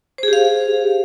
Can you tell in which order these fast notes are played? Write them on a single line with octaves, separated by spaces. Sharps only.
C5 G#4 G4 F5